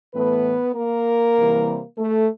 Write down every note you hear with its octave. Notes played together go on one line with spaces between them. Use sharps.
A2 E3 A3 B3 B4
A#3 A#4
C3 E3 G3
A3 A4